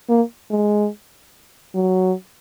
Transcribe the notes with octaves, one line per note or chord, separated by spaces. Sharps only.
A#3
G#3
F#3